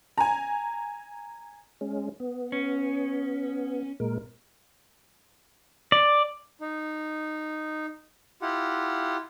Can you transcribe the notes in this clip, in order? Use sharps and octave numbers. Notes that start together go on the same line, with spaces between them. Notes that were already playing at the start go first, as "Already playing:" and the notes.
G#5 A#5
G#3 C#4
B3
C#4
A#2 G#3 A#4
D5
D#4
E4 F4 G4 F#5